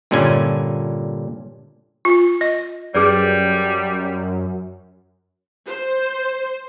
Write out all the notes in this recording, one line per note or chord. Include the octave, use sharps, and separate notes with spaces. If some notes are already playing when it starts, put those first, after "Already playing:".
G2 A#2 D3 C#4 G#5
F4
D#5
F#2 G3 G#4 B4 D5
C5